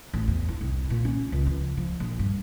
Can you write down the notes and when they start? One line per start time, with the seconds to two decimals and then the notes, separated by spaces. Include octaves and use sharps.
0.14 A1
0.28 E2
0.48 E4
0.61 C2
0.90 A#2
1.05 C#4
1.32 C#2
1.46 F3
1.77 F3
2.00 A#1
2.19 G2